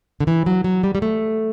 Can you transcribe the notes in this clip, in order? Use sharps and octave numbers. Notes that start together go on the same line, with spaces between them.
D3
E3
F#3
F#3
G3
G3
A3